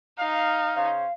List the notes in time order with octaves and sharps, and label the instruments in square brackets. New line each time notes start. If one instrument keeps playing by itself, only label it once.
[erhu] D#4 [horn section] F5
[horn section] C#3 C#4 C5 [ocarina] F5